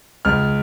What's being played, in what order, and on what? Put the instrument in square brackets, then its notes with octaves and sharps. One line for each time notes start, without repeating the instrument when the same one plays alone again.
[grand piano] C#2 F6